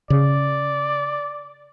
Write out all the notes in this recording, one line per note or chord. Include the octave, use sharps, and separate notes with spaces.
C#3 D5